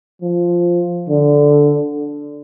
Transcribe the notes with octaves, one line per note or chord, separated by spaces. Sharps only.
F3
D3